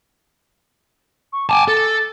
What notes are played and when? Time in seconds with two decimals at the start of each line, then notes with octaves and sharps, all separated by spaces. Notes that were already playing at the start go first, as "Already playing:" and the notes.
1.33 C#6
1.49 G#5 A5 D6
1.68 A4 A6